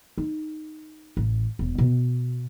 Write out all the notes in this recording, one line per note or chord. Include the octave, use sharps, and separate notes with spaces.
D#4
A1
E1
B2